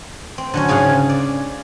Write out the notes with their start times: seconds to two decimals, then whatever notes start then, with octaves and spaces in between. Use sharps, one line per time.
0.38 C4
0.54 D3 F#3 C#4
0.68 G#2 C#3 G#4 F5 F#5
1.09 D5